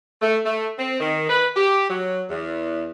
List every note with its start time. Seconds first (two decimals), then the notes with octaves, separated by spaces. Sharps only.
0.21 A3
0.45 A3
0.79 C4
1.00 D#3
1.29 B4
1.55 G4
1.89 F#3
2.30 E2